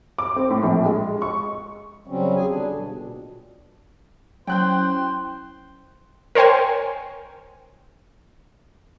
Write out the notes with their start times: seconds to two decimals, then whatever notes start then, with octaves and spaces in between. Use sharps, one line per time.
0.19 D6
0.36 C4
0.50 A2
0.63 A#1
0.85 G#3
1.22 C#6
2.07 C#3 F#3 G3 C4 C#4
2.36 E2 G3 G#4 G#5
2.49 D3 G3 D4
2.67 B2
2.95 A#2
4.47 F#3 C#4 E4 C5 G5 F#6 G6
6.35 A#4 C5 C#5 G5 G#5